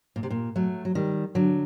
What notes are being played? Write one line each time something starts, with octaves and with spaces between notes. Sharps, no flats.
A#2
C3
A#2
F#3 A3
F#3
D#3 G3
D3 F#3